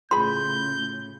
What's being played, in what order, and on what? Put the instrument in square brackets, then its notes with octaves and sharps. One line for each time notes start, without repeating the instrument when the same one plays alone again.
[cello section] A2 C#3 [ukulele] F4 G#4 B5 [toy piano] C6 [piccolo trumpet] G6